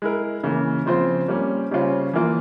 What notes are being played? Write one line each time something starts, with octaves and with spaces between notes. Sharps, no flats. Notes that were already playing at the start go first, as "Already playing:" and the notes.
G#3 E4 A#4
C#3 E3 A#3
C#3 F3 C4 F4 C5
G3 A#3 C#4
C#3 G3 C#4 F4 C5
E3 A#3 F4